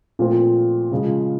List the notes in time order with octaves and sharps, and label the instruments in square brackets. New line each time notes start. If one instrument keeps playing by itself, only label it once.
[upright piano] A#2 F3 A3 C4
C#3 F3 G#3